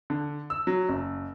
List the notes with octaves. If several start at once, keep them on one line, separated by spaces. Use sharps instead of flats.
D3
E6
F#3
F#1